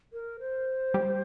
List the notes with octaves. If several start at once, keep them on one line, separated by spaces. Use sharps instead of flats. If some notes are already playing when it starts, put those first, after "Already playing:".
A#4
C5
G3